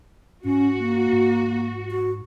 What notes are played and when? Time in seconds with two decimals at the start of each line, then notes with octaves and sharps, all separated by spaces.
0.45 G#2 C#4 F#4
0.79 A#3
1.12 G#2
1.91 F#4